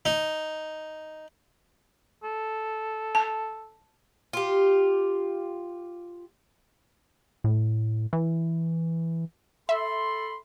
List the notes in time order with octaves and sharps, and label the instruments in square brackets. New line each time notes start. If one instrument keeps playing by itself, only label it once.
[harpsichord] D#4
[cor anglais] A4
[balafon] A5
[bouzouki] F4 G4
[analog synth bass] A2
E3
[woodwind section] A4 B5 C6 [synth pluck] E5